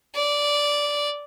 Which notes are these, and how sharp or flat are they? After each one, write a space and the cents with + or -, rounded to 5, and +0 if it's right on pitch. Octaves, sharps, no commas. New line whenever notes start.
D5 -10